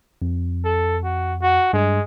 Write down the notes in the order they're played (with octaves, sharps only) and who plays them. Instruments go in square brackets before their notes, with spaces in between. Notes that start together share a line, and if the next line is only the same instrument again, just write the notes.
[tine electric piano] F2
[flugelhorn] A4
F#4
F#4
[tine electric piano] G2 [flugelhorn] G#3